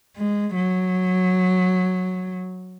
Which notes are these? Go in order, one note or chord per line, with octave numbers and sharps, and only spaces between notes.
G#3
F#3